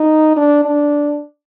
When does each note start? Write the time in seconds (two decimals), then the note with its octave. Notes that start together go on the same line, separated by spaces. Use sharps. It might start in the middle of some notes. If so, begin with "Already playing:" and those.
Already playing: D#4
0.37 D4
0.65 D4